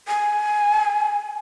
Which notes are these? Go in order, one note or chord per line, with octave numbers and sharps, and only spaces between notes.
G#5